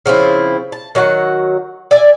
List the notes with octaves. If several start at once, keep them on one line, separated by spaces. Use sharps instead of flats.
C#3 F3 C4 E4
A5
D#3 F#3 F#4 F#5
D5 E5 G#5